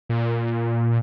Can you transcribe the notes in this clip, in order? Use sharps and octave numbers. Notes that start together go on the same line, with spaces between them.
A#2